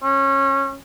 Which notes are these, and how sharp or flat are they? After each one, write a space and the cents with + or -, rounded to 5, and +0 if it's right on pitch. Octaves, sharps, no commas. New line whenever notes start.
C#4 -20